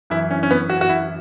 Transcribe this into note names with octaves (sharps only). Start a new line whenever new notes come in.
F#2 E3 E4
C#4
C#4
B3
F#4
F#4
E4